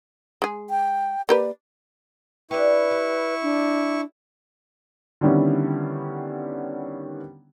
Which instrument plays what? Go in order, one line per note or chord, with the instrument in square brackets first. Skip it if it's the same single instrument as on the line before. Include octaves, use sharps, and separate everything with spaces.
[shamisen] G#3 G#4
[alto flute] G5
[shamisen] A#3 G4 B4 [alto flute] D5
[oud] D4 G4 [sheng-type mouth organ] E4 C#6 [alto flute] B4
[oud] G4
[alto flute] D4
[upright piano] D3 D#3 G3 B3 C#4 E4